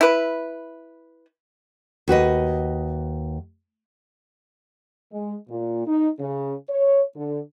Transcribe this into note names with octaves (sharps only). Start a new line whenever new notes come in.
E4 B4
D#2 F#4 B4 D#5
G#3
A#2
D#4
C#3
C#5
D3